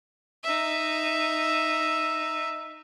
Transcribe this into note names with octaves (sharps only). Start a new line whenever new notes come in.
D#4 E5